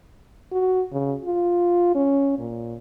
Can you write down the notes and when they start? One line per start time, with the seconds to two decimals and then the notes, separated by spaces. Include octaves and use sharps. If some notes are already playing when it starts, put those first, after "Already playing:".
0.51 F#4
0.92 C#3
1.25 F4
1.95 C#4
2.39 A#2